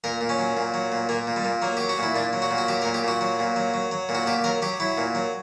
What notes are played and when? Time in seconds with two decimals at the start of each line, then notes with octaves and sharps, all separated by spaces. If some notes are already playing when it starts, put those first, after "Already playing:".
0.04 A#2 A#4
0.21 A#2
0.29 C#4
0.39 F#3
0.57 A#2
0.74 F#3
0.92 A#2
1.09 A#2 A#3
1.27 A#2
1.36 G3
1.45 A#2
1.62 F#3 A#3
1.77 F#3 G4
1.89 F#4
1.98 A#2 E4
2.15 A#2 D4
2.33 F#3
2.42 F#4
2.51 A#2
2.58 F#4
2.68 F#3 G4
2.82 A#4
2.85 A#2
2.94 G4
3.04 A#2 F#4
3.21 F#3
3.39 A#2
3.56 F#3
3.74 F#3
3.91 F#3
4.09 A#2
4.15 F#4
4.27 A#2 G4
4.44 F#3 A#4
4.62 F#3 G4
4.80 F#3 E4
4.98 A#2
5.15 F#3